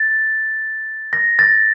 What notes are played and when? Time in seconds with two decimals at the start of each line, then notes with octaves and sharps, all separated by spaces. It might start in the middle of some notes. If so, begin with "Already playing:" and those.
Already playing: A6
1.13 A#6
1.39 A6